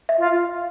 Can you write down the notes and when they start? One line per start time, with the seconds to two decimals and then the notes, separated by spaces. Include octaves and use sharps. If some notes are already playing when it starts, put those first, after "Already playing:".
0.09 E5
0.18 F4